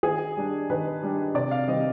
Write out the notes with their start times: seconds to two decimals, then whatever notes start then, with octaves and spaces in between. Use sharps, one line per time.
0.03 D#3 G#4
0.36 G3 D4
0.70 D#3 B4
1.03 G3 D4
1.34 C3 D5
1.51 F5
1.68 D#3 G3 C4 D#5